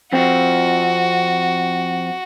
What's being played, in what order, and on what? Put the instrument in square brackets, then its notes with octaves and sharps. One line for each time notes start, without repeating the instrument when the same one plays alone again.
[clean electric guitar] F2 C4 [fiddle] F#4